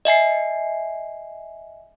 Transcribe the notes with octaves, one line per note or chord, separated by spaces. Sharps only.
D#5 E5 G#5 C7